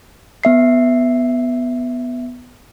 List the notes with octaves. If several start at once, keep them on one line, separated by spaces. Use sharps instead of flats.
B3 E5 C7